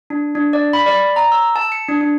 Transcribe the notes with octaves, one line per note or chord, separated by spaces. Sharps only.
D4
D4
D5
B5
D5
A#5
E6
A5
C#7
D4
D4